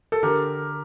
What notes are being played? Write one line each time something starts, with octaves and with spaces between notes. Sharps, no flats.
A4
D3 G4 A#4